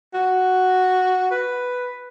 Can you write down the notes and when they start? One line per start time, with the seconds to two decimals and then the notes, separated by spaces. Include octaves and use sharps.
0.14 F#4
1.31 B4